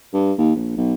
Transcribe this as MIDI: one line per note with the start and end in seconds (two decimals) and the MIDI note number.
0.13 0.32 43
0.38 0.55 39
0.56 0.75 34
0.77 0.94 35